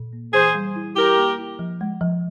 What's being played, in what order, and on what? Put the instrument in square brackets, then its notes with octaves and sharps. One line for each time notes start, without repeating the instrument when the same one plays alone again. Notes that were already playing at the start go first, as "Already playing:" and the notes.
Already playing: [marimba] A#2
A#3
[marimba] E3 [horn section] G#4 C5
[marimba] G3
E4
[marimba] E4 [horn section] G4 A#4
[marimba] A#3
E4
F3
G#3
F3